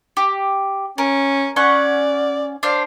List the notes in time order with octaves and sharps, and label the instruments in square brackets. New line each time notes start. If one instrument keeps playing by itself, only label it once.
[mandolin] G4
[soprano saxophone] C#4 [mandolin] A#4
[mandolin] C#4 F#5 C#6 [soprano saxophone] D5
[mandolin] D4 C5 F5